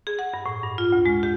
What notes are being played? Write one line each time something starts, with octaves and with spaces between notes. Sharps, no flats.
G#4
F#5
G2
A2
G2
F4
D2
G#3
G4